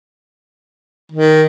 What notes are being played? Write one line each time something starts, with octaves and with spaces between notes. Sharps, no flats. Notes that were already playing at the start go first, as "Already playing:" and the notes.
D#3